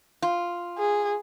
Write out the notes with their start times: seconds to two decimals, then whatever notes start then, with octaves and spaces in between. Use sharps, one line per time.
0.22 F4
0.78 G#4